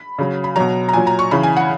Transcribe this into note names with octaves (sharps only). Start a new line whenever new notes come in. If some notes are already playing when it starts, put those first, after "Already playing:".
Already playing: B5
C#3 F#3
B5
B2 F#3 A#5
A#5
A#2 F#3 G#5
A#5
C#6
C#3 E3 B5
G#5
F#5